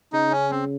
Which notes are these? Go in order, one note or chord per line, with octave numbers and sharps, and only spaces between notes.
C#3 D#4
C#4
C4